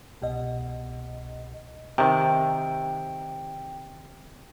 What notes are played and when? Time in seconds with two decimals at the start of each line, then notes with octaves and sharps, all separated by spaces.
0.22 C2 B2 D#5
1.98 C3 D#3 G5